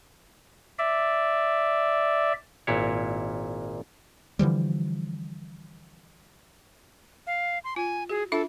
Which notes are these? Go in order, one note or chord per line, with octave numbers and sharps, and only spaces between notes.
D5 E5
G#1 A#2 E4 C#5
D3 E3 F3 G3
F5
C6
F4 G#5
F#4 G#4
D4 F4 A4 E5